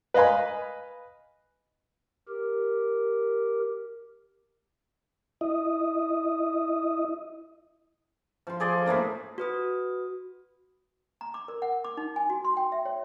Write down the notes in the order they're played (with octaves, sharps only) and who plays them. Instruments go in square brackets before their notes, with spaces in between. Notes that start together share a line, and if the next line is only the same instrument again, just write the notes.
[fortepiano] B4 D#5 F5 G#5 B5
[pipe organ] G4 A#4
[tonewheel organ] E4 D#5
[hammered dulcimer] F3 C6
F3 G#4 D5 C6
A2 F3 A#3 D4
[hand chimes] F#4 B4 D#6
[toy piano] A#5
D6
A#4
F#5
D6
D#4
G#5
F#4
C6
G5
E5
C#5